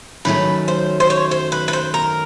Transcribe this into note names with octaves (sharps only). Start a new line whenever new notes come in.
F#2 D#3 F#3 A3 C#4 B4
C5
C5
C#5
C5
B4
B4
C5
A#4